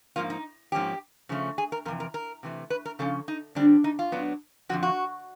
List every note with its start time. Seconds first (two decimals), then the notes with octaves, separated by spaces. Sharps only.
0.16 G#2 F3 A#3 F4
0.30 D#4
0.72 G#2 F3 A#3 C#4 G4
1.29 C#3 F3 A3 C#4
1.58 G#4
1.72 A#4
1.85 F2 C3 E3 A#4
2.00 A#4
2.14 A#4
2.43 C3 E3 A3
2.70 B4
2.85 A#4
2.99 C#3 F3 C#4 A4
3.28 D#4
3.55 D3 G3 C4 D4
3.84 D#4
3.99 F4
4.12 A2 F#3 B3 D4
4.69 F2 D3 F3 F#4
4.83 F#4